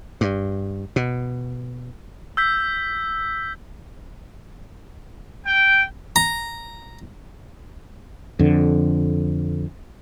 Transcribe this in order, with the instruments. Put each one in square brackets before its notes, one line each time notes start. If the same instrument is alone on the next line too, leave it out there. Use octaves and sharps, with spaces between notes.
[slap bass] G2
B2
[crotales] E6 G6 B6
[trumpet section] G5
[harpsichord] A#5
[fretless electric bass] F2 D3